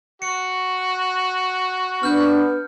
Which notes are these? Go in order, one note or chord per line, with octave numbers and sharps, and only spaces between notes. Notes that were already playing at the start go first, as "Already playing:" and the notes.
F#4 C#7
B3 D4 F6 G6